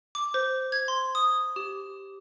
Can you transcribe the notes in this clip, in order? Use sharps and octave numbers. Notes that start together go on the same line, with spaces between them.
D6
C5
G#6
C6
D#6
G4